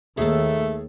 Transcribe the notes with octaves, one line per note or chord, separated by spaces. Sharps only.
D#2 A3 G#4 A4